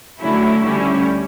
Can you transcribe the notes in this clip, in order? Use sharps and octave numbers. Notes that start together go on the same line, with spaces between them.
D3 F#3 A3 C#4 E4
D2 D3 G3 C#4 E4